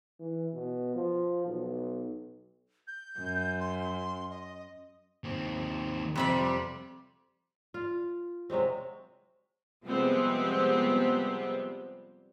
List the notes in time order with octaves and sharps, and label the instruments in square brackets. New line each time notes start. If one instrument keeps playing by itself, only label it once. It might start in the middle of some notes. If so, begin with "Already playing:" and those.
[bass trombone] E3
B2
F3
B1
[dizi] G6
[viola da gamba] F#2
[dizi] C6
D#5
[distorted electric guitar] D#2 C4
[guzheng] F2 C3 B5 [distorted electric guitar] G3 G4
[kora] F4
C3 F#3 G#3 C4
[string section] C3 F3 G3 G#3 B3 C4